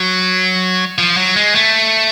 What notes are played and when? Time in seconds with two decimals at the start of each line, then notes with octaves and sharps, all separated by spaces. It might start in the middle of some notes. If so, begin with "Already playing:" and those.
Already playing: F#3
0.98 F3
1.17 F#3
1.36 G#3
1.55 A3